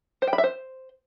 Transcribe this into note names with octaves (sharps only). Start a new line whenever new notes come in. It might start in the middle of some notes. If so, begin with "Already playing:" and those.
C5
G5
B5
E5
C5